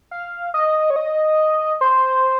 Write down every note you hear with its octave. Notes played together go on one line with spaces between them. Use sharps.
F5
D#5
C#5
D#5
C5